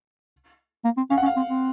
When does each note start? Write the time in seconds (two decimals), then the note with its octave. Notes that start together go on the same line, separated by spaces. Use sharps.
0.84 A#3
0.97 C4
1.10 C#4 F5
1.18 F#5
1.22 C#4
1.26 F5
1.36 C4
1.48 C4